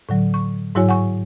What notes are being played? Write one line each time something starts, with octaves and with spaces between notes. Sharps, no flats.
A2 D3 F#3
C#6
G#2 F#3 E4 F#4 C#5 G#5
F#5 G#5 C#6